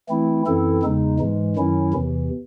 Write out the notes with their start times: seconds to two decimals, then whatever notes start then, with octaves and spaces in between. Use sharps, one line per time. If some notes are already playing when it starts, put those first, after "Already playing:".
0.09 E3 A3 C4 E4
0.46 F#2 E3 C4 E4 A4
0.83 E2 C#3 G#3 D#4
1.19 G#2 E3 G#3
1.56 F#2 D#3 F#3 C#4 E4
1.93 E2 C3 E3